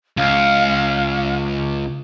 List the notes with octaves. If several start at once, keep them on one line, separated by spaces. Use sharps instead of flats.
C#2 F5